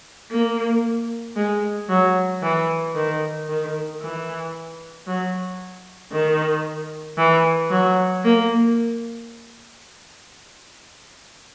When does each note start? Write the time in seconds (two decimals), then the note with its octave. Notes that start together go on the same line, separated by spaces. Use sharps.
0.32 A#3
1.36 G#3
1.89 F#3
2.43 E3
2.96 D#3
3.49 D#3
4.02 E3
5.07 F#3
6.12 D#3
7.18 E3
7.71 F#3
8.24 A#3